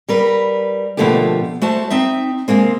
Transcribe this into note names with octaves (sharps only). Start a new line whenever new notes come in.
G3 A#4 B4
B2 D3 F3 A3 A#3 G4
A3 F#4 C5 A5
C4 D#4 E5
C3 G#3 A#3 C4